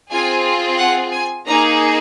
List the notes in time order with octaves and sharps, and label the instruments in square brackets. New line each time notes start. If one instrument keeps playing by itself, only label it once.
[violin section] C4 F4 G#4 G#5
F#5
G#5
A#3 D#4 G#4 A#5